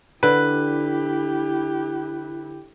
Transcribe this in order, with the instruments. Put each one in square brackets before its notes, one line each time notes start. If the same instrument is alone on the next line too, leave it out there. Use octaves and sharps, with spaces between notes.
[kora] D3 [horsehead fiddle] E4 G4 [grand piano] B4